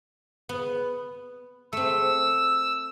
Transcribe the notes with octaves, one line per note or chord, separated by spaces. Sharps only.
B3
A3 C4 E6